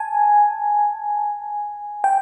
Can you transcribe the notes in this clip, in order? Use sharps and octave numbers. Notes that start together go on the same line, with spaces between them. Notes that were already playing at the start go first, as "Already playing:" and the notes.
Already playing: G#5 A5
G5